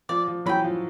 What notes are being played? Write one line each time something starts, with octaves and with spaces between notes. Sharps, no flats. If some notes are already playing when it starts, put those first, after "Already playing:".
F3 D5
F3
E3 F#3 G5 B5
F3